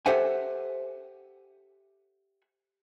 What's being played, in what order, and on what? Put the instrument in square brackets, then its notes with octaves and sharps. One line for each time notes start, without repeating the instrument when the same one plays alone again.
[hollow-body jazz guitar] G4 A4 C5 E5 F#5 G#5